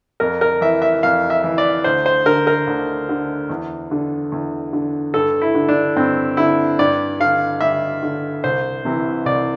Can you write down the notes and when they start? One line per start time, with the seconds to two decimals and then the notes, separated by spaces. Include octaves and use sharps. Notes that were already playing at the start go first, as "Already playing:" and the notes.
0.20 F2 A#4
0.41 A#4
0.61 E3 E5
0.82 E5
1.03 F2 F5
1.30 E5
1.44 E3
1.58 D5
1.84 D2 C5
2.06 C5
2.26 D3 A#4
2.47 A#4
2.67 D2
3.09 D3
3.50 E2
3.91 D3
4.32 E2
4.73 D3
5.14 G2 A4
5.42 E4
5.55 D3
5.68 D4
5.97 G2 C4
6.37 D3 E4
6.79 G2 D5
7.20 D3 F5
7.61 G2 E5
8.03 D3
8.44 C2 C5
8.85 C3 E3
9.25 C2 D5